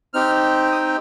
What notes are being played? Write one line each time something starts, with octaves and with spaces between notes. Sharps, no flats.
C4 D#4 G4 F6
D#6